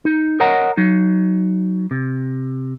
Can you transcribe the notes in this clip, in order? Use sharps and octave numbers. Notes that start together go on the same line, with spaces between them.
D#4
A#4 C#5 D#5 F#5 A#5
F#3 D#4
C3